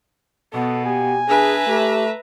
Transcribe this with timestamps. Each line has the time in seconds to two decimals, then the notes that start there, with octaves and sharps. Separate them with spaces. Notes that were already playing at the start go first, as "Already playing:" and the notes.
0.53 B2 B3 A4
0.86 G4 G#5
1.28 D4 G#4 B4 E5 A#5
1.67 A3 G4